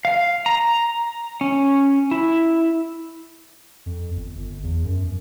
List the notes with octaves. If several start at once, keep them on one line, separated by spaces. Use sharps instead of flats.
F5
A#5
C#4
E4
F2
G1
G1
E2
F#2
F#2